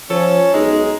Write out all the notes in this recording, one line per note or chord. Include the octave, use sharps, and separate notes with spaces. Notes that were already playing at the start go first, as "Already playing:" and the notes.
F3 C#4 A4 C#5
B1 G#3 D#4